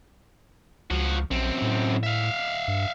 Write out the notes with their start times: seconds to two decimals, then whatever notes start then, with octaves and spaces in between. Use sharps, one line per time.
0.91 C#2 F3 F#4
1.31 A#1 F#2 C4
1.62 A2
2.03 E5 F5
2.68 G2